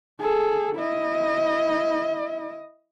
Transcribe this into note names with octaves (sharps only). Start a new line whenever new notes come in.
G#4 A4
E4 D#5